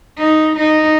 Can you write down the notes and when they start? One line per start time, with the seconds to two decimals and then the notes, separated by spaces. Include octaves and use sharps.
0.18 D#4
0.56 D#4